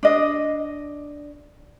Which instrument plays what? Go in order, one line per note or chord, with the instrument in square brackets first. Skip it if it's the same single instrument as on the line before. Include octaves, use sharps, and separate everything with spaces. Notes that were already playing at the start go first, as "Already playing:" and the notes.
[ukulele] D4 D#5